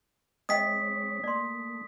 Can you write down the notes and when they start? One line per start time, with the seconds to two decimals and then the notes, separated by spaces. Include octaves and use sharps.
0.49 G#3 C4 C#5 D#5 E5 G5 D#6 B6
1.24 A3 A#3 D5 C6